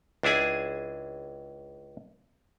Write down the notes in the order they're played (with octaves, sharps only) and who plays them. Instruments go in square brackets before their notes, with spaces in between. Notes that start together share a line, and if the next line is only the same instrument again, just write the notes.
[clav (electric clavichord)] C#2 D4 E4 G#4 G#5